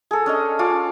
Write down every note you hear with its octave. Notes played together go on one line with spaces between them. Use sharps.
G#4 A4
C#4 D4 D#5
C#4 F4 D6